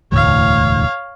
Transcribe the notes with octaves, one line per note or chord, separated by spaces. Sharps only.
E1 D2 A2 C#5 F5